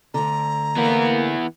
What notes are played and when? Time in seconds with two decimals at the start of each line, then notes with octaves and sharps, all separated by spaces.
0.14 D2 D3 A#5
0.77 E3 A#3 B3